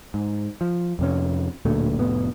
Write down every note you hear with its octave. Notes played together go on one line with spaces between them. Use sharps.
G#2
F3
F2 C3 C#4
D1 D2 A#2 A3
F1 A2 B3